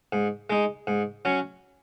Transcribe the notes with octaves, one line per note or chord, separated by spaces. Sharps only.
G#2
G#3 D#4
G#2
F#3 C#4